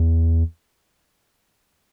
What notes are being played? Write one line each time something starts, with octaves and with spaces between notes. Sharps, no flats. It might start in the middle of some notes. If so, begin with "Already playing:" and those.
Already playing: E2